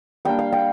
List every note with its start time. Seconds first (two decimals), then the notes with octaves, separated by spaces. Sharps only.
0.25 G3 A#3 D4 G5
0.39 F5
0.52 G5